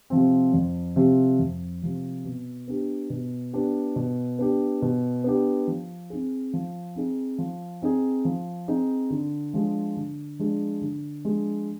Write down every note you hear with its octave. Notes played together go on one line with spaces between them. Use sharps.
C3 F3 C4
F2
C3 F3 C4
F2
C3 F3 C4
B2
B3 D4 G4
B2
B3 D4 G4
B2
B3 D4 G4
B2
B3 D4 G4
F3
C4 D#4 G#4
F3
C4 D#4 G#4
F3
C4 D#4 G#4
F3
C4 D#4 G#4
D3
F3 G#3 D4 G#4
D3
F3 G#3 D4 G#4
D3
F3 G#3 D4 G#4